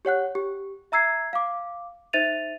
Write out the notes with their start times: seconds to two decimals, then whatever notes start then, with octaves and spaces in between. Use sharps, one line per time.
0.05 G4 C#5 F#5 F#6
0.35 G4
0.92 E5 A#5 E6 G#6 C7
1.33 F5 D6
2.13 D#4 C5 E5 A6 D#7 F7